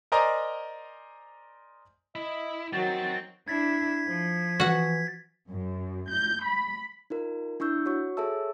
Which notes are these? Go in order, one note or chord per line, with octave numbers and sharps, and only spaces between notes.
A#4 C5 D5 D#5 G#5 A#5
E4 D#5
D#3 F#3 C4 F#4 A6
D4 E4 G#6 A6 B6
F3
E3 F#4 F#5
F#2
G6
B5
D#4 F4 A#4
D4 E4 C#6 E6 G6
F#4 C#5 C#6
G#4 A4 C#5 E5 A5 E6